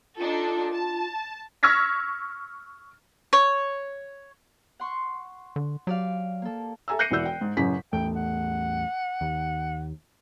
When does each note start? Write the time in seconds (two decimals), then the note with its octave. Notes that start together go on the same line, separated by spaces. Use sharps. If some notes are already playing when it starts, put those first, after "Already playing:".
0.18 D4 D#4 F4 A4
0.72 A5
1.63 C#6 E6 F6 G#6 A#6 B6
3.33 C#5
4.79 F#5 C6 C#6
5.56 D3
5.87 F#3 G4 D5 F5
6.42 A#3 A4
6.88 A4 E5 G#5 A#5 E6
6.99 F#6 G6 A#6 C7 C#7 D#7
7.11 E1 E3 F#4 D5 E6 G6
7.25 G5
7.41 G#2
7.57 A1 F#2 C#3 B6
7.93 A1 E2 A3 G5
8.16 F#5
9.21 D#2